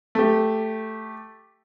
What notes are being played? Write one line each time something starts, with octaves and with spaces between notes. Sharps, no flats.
A3 G4